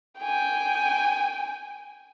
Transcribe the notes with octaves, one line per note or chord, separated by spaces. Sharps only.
G5 G#5